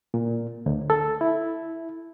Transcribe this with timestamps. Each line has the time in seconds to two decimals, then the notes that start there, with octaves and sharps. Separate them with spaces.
0.14 A#2
0.66 D2
0.90 A4
1.21 E4